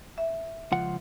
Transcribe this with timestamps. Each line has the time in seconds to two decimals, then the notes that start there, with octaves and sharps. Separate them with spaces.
0.18 E5
0.72 C#2 F3 F#5